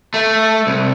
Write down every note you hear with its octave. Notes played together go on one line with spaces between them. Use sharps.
A3
C2